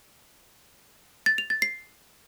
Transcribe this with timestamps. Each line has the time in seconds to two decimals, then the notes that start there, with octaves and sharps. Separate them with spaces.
1.26 A6
1.38 F7
1.50 A6
1.62 C7